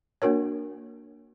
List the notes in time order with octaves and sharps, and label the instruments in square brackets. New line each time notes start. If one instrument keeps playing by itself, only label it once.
[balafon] A#3 D4 F#4 A#4 C#5